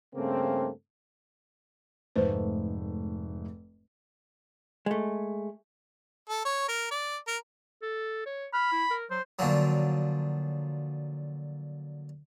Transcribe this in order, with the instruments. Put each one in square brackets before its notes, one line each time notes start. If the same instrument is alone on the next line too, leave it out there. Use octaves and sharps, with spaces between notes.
[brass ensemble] G2 C#3 A3 A#3 C4
[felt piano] F1 G#2 A3 [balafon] B4 C5
[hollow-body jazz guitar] G#3 A3
[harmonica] A4
C#5
A#4
D5
A#4
[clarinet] A4
C#5
[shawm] B5 [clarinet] F6
[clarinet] E4
A#4
[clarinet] F#3 [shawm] C5
[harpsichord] A#2 D3 F3 F#3